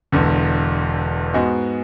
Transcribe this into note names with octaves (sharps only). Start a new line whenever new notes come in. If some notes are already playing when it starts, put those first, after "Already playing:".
E1 E2 D3
G#2 G#3 B3 F#4